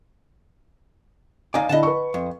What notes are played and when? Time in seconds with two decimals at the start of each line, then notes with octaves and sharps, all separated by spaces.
1.54 D#2 D#4 D5 F5 G#5
1.69 D3 E4 D#5 F#5 A5
1.83 B4 C#6
2.14 F2